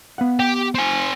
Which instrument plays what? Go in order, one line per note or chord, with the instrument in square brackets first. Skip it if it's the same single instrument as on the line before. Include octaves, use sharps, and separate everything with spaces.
[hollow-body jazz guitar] B3 F5 F#5
[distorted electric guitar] G4
C4 G#5